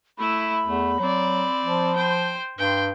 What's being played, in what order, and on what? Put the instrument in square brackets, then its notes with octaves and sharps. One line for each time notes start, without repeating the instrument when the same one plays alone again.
[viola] A3 E4 [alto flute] B5
[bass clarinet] E2 [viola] A3
[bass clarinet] F#3 [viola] C4 D5
[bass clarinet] F3
[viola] C5 G5
[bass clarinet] G2 [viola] G5 C6